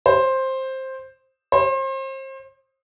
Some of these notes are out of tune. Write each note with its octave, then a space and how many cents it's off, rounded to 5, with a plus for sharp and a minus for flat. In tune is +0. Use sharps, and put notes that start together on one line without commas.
C5 +10
C5 +35